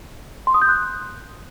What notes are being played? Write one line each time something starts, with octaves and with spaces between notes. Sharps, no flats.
C6
D#6
G6
F#6